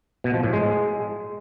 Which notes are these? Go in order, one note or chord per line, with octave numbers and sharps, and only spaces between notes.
B2
F3
A2
G#3